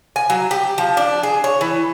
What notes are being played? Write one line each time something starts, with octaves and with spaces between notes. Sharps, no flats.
G#5
F#3
G4
F3
D4
G#4
C#5
E3